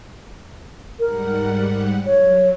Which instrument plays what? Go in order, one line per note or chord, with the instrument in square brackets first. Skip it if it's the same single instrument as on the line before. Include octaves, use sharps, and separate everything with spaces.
[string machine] G#2 G3 F#5 [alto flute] A#4
[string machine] F#3 [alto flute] C#5